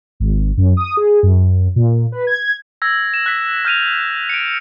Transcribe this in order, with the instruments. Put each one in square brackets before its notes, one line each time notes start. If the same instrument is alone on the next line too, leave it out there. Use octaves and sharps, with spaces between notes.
[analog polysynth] G#1
F#2
D#6
G#4
F#2
A#2
B4
G#6
[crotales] E6 G#6 A#6
E7
F#6 B6
F6 G6 D#7 F7
C#7 D7